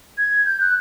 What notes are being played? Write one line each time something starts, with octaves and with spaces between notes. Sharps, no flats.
G#6
G6
F#6